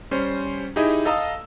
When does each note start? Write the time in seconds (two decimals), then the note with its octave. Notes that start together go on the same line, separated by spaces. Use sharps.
0.11 G3 C#4 C5
0.76 D#4 E4 G4 G#4 D#5
1.05 A4 D#5 F5 A#5 D#6 E6